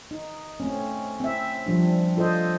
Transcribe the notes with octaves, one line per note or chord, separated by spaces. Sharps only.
D#4
A3 C4 C#4
C4 E5
F3 G3 D4
F4 A4 C5 D#5